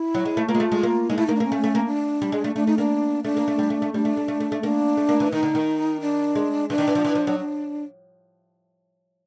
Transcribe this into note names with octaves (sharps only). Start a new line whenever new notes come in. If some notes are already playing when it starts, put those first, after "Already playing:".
Already playing: E4
F#3
G#3
A3
A#3 F4
G#3
A3
G#3
A#3
G#3 D#4
A3 E4
A#3 D#4
D4
A#3 C#4
A3
A3
A#3
D4
G3
G#3
A3
A3 D4
A3 D#4
A#3 D4
A3 D4
A#3
A3
G3
A3
A3
G3 D4
A3
A3
A3
A3
A3
A#3 D4
A3
A#3
E3
D#3 D#4
D3
D#3
D4
G#3
E3 D4
D#3
E3
F3
E3
F3
F#3
D4